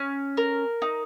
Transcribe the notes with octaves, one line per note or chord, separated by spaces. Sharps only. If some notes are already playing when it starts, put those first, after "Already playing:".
Already playing: C#4
A#4
D#4